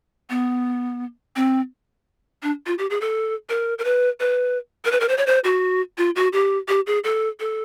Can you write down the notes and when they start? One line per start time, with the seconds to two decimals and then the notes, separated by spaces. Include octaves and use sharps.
0.30 B3
1.36 C4
2.43 D4
2.66 F4
2.78 G4
2.90 G#4
3.01 A4
3.49 A#4
3.78 A#4
3.84 B4
4.20 B4
4.85 A#4
4.92 B4
5.00 A#4
5.09 C5
5.18 C#5
5.27 C5
5.44 F#4
5.98 F4
6.16 F#4
6.33 G4
6.68 G4
6.87 G#4
7.04 A4
7.40 A4